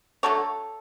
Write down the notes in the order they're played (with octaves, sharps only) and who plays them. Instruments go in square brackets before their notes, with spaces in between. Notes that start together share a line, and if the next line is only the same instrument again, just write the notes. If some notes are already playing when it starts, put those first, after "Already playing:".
[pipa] D3 F#3 A3 A4 C#5